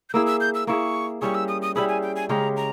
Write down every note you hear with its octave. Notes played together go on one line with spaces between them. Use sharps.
G6
A#3 E4 G#4 E6
E6
G6
E6
A#3 E4 G#4 C#6
G3 C#4 E4 G#4 C#6
E6
D#6
D#6
G3 C#4 E4 G#4 B5
G#5
G5
G#5
C#3 G#3 C#4 G4 A#5
A#5